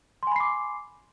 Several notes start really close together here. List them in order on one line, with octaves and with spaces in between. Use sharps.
C6 G#5 B5 C7 D6